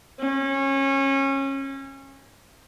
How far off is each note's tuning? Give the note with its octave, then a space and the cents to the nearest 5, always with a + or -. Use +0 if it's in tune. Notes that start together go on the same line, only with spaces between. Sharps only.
C#4 -25